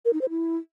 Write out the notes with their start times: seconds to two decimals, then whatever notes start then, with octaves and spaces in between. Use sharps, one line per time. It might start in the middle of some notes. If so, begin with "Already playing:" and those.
0.05 A#4
0.13 D#4
0.21 C5
0.30 E4